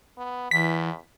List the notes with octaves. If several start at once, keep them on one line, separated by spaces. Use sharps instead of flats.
B3
E2 E3 B6